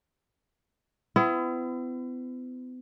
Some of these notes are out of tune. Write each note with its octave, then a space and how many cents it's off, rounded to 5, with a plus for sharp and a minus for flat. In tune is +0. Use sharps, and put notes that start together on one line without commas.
B3 +45 E4 +35